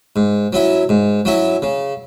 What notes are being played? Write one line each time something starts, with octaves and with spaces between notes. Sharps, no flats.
G#2
F#3 C#4 E4
G#2
F#3 C#4 E4
C#3